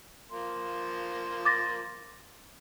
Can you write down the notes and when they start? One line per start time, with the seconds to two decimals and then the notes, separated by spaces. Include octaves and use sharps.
0.31 F3 A#3 C6
1.45 D6 A6 A#6